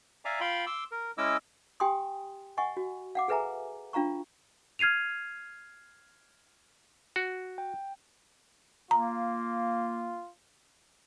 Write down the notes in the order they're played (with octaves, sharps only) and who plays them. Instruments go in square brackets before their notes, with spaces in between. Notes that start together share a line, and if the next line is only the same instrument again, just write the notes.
[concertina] D5 E5 F5 G#5 A#5 D6
F4 F5 G5 B5 C6
C6 D6 E6
A#4
G#3 C#4 E4 D#5 D6 E6
[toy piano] G4 G5 G#5 C6 D#6
D#5 F#5 G#5 C#6
F#4
F5 F#5 D6
G#4 A4 B4 E5 G#5 A#5
D4 F4 F5 A#5 C#6
[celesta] F6 G#6 C7 D#7 F7
[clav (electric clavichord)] F#4
[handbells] G5
[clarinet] A#3 [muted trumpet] F4 [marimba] A#5